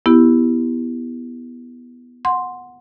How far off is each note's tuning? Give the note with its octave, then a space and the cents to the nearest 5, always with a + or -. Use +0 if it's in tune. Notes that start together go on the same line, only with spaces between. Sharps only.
B3 +0 E4 +0 G4 +0
F#5 -15 C6 +0